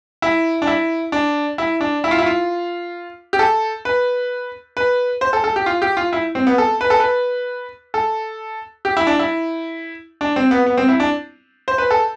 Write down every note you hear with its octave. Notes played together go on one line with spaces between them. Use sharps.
E4
D4
E4
D4
E4
D4
E4
F4
E4
F4
G4
A4
B4
B4
C5
A4
A4
G4
F4
G4
F4
E4
C4
B3
A4
B4
A4
B4
A4
G4
E4
D4
E4
D4
C4
B3
B3
C4
E4
D4
C5
B4
A4